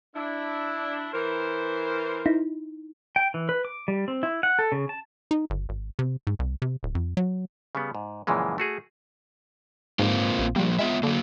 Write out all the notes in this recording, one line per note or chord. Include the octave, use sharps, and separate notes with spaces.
D4 E4
E3 A#4 C5
D#4 E4
G5
E3
B4
D6
G3
C4
E4
F#5
A4
C#3
A5
D#4
G1
G#1
C3
G#2
C2
C3
D1
F2
F#3
C#3 G3 B3
G#2
F#2 A#2 C#3 E3 F3 G#3
A3 F#4 G#4
G#2 A#3 C4 F4
A#1
F3 G3 A#3
G#3 B3 F4 E5
D3 F#3 A#3